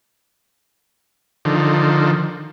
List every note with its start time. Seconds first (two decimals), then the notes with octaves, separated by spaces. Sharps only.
1.45 D3 D#3 F3